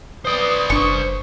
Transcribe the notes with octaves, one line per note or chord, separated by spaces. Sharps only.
B4 C5 D5 D#6
F#1 D4 C#6